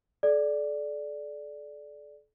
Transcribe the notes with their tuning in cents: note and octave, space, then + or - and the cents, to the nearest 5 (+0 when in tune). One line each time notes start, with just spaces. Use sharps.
A4 -40 D5 +0